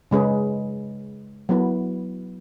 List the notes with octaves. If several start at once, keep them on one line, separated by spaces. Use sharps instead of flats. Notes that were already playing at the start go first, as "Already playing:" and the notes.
C#3 G#3 C#4 G#4 B4
F#3 B3 E4 B4